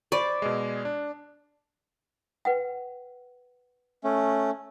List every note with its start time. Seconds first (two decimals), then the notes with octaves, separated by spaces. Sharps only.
0.12 C5 D5 B5 C#6
0.42 B2 G#3
0.85 D4
2.45 B4 F#5 G5
4.04 A3 C#4